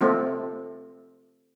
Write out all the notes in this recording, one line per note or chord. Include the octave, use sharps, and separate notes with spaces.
A3 C4 F4